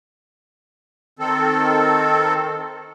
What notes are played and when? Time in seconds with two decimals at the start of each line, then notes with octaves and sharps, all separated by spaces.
1.19 D#3 C4 A4